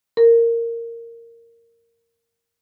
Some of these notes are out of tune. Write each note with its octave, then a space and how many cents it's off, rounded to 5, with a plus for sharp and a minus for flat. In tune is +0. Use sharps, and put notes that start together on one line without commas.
A#4 -10